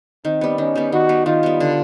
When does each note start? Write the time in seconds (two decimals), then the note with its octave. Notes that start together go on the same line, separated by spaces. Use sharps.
0.25 D#3 C4
0.41 G3 B3
0.58 D#3 C#4
0.75 G3 B3
0.92 D#3 F#4
1.09 G3 B3
1.26 D#3 F4
1.43 G3 B3
1.60 D3